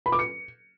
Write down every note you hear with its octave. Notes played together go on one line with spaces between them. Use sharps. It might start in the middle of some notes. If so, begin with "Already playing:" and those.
B5
D6
C#7